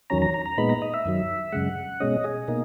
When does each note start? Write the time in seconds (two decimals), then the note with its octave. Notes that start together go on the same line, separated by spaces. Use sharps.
0.10 E2 D#3 F#3 C#4 A#5
0.22 A#5
0.34 A#5
0.46 A#5
0.57 A#2 G#3 B3 D#4 B5
0.69 A#5
0.82 D#5
0.94 E5
1.05 F#2 D#3 F#3
1.52 F#2 C#3 G#3 F#5
2.00 B2 G#3 C#4 D#5
2.24 G#4
2.48 B2 A#3 D#4